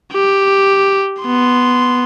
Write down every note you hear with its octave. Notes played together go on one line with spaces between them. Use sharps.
G4
B3 C6